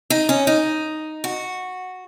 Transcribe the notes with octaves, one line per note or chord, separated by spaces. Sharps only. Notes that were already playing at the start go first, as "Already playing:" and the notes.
D#4
C#4
D#4
F#4